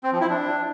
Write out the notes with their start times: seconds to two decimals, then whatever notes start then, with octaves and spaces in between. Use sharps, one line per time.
0.03 C4
0.12 F3
0.21 E4
0.30 D4